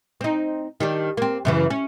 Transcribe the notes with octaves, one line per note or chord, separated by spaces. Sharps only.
C4 D#4
D#3 G3 D4
A#3 C4
F#2 C#3 E3
C#4